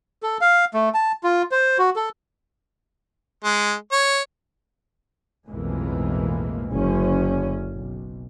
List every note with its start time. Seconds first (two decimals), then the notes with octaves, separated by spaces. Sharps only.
0.23 A4
0.41 F5
0.74 A3
0.94 A5
1.23 F4
1.52 C5
1.78 F#4
1.96 A4
3.44 G#3
3.92 C#5
5.49 B1 F2 A2 E3 G#3 A#3
6.71 F#1 D3 C#4
7.73 B1